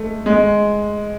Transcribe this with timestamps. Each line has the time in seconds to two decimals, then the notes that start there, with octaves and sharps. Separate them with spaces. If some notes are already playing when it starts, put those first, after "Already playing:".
Already playing: G#3 A3
0.26 G#3